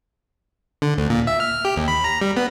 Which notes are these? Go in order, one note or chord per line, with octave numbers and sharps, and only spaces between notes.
D3
D2
A#2
E5
F6
G4
D#2
B5
A#5
G3
B3